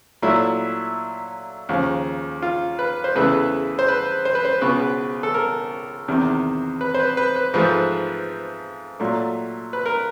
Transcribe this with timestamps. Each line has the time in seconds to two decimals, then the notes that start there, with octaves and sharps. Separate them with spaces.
0.22 A#2 F#3 A3 E4
1.69 D#2 C#3 F3
2.42 F4
2.79 B4
3.04 C5
3.15 E2 C#3 E3 A3 B4
3.79 C5
3.88 B4
4.25 C5
4.35 B4
4.45 C5
4.61 C#2 B2 G#3 B4
5.23 A4
5.34 A#4
6.08 E2 C3 D#3
6.81 B4
6.94 C5
6.99 B4
7.17 B4
7.36 B4
7.54 G#2 F3 A3 B4
9.00 A#2 F#3 A3
9.73 B4
9.86 A#4